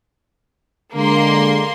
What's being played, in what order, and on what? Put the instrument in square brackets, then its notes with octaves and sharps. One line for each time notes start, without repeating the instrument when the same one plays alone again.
[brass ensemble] D3 G#3 [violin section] A#3 C6